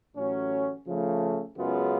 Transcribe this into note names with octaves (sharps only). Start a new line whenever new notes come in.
A1 A2 F#3 C#4
C#3 F3 A3
F#2 C#3 G#3 B3 F4